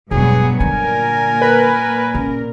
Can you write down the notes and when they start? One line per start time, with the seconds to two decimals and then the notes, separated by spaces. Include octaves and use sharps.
0.11 E1 G2 F#3 B3 G#4
0.60 A#2 D3 A#4 G#5
1.42 B4
2.15 C#3